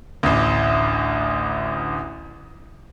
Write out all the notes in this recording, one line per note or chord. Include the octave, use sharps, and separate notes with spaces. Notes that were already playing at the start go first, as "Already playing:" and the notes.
A1 D2